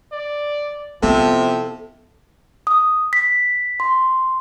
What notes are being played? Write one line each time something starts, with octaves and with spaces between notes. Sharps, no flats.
D5
C3 F3 B3 E4 A4
D#6
B6
C6